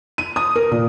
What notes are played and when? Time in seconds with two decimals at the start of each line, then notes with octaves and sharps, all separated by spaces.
0.18 D#7
0.36 D#6
0.56 A#4
0.71 A#2